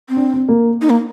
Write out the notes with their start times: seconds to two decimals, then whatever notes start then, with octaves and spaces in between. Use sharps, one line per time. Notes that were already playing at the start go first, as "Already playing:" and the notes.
0.09 C4
0.17 D4
0.33 C4
0.48 A#3
0.81 D#4
0.90 A#3